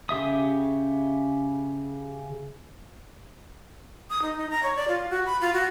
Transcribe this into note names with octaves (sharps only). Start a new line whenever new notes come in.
C#3 G4 E5 D#6
D#6
D#4
D#4
A#5
C#5
D5
F4
F#4
B5
F4
F#4